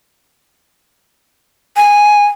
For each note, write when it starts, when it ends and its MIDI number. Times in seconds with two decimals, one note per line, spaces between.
1.76 2.26 80